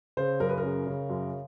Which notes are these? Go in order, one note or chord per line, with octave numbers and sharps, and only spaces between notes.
C#3 C5
F#2 A#4
B4
A#4
C#3
C#3
F#2